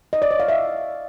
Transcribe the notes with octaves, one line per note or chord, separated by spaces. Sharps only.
D#5
D5
C#5
F5
E5